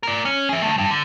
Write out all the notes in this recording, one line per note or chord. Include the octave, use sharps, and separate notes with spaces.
A#4 D5
C#4
G#4 E5
D3 A3
G2
D3